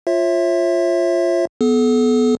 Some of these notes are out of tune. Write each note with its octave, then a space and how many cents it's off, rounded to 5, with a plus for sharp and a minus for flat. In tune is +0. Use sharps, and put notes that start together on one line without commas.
F4 +0 C#5 -35 E5 +0
B3 +0 A4 -35